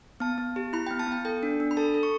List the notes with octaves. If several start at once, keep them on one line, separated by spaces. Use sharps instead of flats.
B3 A5
B3
G4
E4 B5
B3 G5
A5
B3 G5
A4 G5
D4
D4
B5
A4 A5
A4
C#6